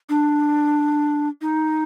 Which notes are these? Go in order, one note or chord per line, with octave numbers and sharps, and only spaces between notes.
D4
D#4